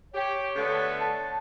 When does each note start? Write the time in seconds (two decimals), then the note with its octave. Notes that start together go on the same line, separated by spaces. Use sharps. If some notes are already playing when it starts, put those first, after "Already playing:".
0.14 G4 C#5
0.55 D3 A3 B3
1.01 A5